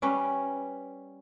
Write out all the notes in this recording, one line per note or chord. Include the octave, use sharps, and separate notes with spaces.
G3 C#4 B4